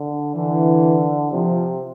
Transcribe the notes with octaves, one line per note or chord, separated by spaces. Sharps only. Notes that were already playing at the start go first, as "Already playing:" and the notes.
Already playing: D3
D3 E3
C3 F3